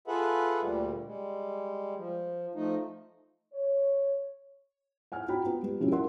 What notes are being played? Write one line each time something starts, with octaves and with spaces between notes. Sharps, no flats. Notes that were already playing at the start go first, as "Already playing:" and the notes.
F4 G#4 A4 B4 E5 F#5
D2 A#2 G3
G3 G#3
F3
F3 A3 D#4
C#5
F#5 G#5 F6
F#4 G5 A#5 B5
B3 F4
G3
B2 F3 C#4 E4 G4
A#4 E5 F#5 C6